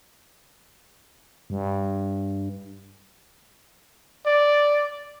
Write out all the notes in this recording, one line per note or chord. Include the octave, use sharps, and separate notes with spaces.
G2
D5